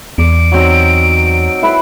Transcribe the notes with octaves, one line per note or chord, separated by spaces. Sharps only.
E2 D5 D7
F#3 C4 D#4
E4 B4 C5